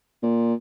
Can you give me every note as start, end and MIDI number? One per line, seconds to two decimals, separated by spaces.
0.23 0.54 46